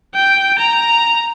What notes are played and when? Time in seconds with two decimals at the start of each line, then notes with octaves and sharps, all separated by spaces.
0.15 G5
0.59 A#5